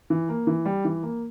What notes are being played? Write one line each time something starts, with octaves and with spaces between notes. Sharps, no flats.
E3
A#3
E3
G3
E3
A#3